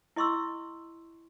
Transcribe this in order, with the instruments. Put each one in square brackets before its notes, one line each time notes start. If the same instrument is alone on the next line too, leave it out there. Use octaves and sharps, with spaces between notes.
[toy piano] E4 D#5 C6 C#6 E6